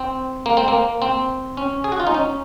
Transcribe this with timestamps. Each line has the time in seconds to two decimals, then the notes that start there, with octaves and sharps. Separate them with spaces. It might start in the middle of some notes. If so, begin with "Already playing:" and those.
Already playing: C4
0.46 A#3
0.57 C4
0.68 A#3
1.02 C4
1.57 C#4
1.84 G#4
1.92 F#4
2.00 F4
2.07 D#4
2.14 C#4